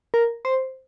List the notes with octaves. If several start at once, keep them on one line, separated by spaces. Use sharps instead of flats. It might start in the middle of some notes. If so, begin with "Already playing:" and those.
A#4
C5